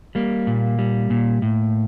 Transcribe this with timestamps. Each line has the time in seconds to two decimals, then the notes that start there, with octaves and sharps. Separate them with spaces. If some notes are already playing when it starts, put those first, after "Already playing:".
0.15 G3 A#3
0.47 A#2
0.79 G3
1.10 A#2
1.42 A2